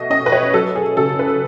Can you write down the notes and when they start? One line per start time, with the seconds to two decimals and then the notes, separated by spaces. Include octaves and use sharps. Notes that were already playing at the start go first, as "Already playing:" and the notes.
Already playing: B2 A3 D#5
0.10 C#4 D#5
0.26 B4
0.32 C#5
0.54 F#3 A4
0.76 G#4
0.97 C#3 A4
1.19 B4